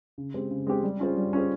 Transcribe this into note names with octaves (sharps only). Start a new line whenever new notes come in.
C#3
G#3 C4 G4 C5
C#3
G#3 C4 G4 C5
G3
C#4 F4 G#4 C5
G3
C#4 F4 G#4 C5